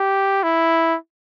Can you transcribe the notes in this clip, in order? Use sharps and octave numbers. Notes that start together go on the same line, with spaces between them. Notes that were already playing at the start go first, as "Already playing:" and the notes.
Already playing: G4
E4